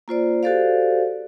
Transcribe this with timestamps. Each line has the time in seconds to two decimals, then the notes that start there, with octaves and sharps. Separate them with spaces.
0.08 A#3 F4 C5 D5
0.43 F#4 G4 A4 C5 D5 F5